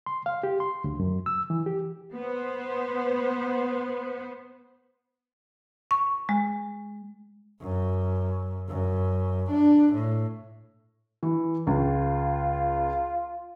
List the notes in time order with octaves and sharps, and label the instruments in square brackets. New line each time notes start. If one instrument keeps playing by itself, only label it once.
[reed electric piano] C6
F5
G4
C6
D2
F#2
E6
E3
G4
[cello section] B3 C5
[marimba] C#6
G#3
[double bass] F#2
F#2
D4
A2
[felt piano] E3
[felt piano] C#2 [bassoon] F4